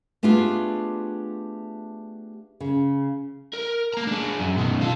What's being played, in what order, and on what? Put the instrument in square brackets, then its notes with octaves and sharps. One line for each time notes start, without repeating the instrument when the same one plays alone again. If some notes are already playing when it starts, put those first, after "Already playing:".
[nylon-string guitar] A3 B3 D4 F4 G4 G#4
C#3
[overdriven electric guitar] A#4
A#3 A#5
D4 G#4
F#2
B2 D#3
F4 A4